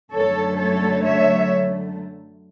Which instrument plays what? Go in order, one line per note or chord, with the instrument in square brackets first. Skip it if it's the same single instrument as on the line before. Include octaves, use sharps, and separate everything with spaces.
[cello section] F#2 D3 F#3 A3 A4 C#5
A4 C#5
C#5 E5